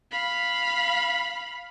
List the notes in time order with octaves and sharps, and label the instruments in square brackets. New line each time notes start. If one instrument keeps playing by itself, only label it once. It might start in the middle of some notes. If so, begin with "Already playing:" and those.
[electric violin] F5 B5